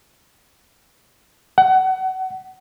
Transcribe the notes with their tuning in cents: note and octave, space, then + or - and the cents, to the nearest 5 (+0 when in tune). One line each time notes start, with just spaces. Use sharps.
F#5 +25